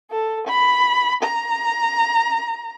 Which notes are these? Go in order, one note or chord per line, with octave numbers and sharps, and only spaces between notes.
A4
B5
A#5